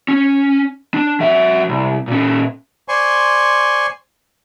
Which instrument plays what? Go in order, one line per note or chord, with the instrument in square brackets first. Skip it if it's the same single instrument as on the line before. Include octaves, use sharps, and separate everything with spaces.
[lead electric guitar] C#4
D4
F#3 E5
C2
A#2 C#4
[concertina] C5 D5 G#5 C6 C#6